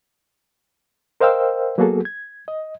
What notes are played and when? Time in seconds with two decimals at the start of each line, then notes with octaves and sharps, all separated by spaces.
1.21 A#4 C5 D#5 F5 G5 E6
1.78 F#3 A#3 B3 F#4 G#4 A4
2.05 G#6
2.48 D#5